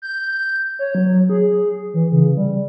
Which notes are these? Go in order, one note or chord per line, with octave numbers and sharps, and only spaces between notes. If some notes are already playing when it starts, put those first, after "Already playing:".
G6
C#5
F#3
G#4
E3
C#3
G3